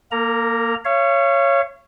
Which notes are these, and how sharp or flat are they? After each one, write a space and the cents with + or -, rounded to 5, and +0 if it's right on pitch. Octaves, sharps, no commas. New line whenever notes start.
A#3 +0 A#4 -45 A#5 +0
C#5 +0 F5 -40